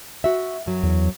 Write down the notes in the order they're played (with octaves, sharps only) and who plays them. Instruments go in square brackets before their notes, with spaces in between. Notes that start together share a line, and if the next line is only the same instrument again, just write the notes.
[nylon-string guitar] F#4 E5
F#2 F#3
[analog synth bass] E2